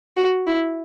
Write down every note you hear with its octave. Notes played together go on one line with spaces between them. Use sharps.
F#4
E4